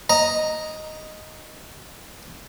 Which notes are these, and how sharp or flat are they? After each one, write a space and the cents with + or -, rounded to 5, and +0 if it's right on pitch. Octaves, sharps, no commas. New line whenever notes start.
D#5 +0 A#5 +0